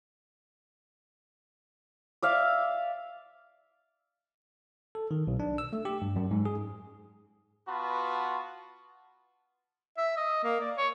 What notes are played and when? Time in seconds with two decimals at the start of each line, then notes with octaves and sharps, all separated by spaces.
2.23 D5 E5 F5
4.95 A4
5.11 D#3
5.27 B1
5.40 D4
5.58 E6
5.73 A3
5.85 G4
6.02 G2
6.16 F#2
6.31 G#2
6.45 G#4
7.67 B3 F4 F#4 B4 A5
9.98 E5
10.17 D#5
10.44 A#3
10.60 D5
10.77 C#5